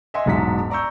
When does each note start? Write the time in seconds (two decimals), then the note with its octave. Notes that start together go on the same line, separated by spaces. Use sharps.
0.14 D#5 E5 F#5 G#5 C6
0.26 E1 G#2 F#3 B6
0.70 D5 A#5 C#6 E6 G6